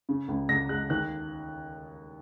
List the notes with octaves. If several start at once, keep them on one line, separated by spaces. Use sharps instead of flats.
C#3
C#2
C#2 A#6
G#3 F#6
D#2 F#6